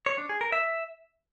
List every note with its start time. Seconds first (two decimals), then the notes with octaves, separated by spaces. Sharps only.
0.06 C#5
0.18 D4
0.29 G#4
0.41 A#4
0.52 E5